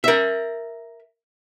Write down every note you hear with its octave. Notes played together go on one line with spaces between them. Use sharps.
A#4 E5